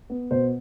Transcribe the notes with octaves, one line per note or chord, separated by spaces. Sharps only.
B3
B2 C5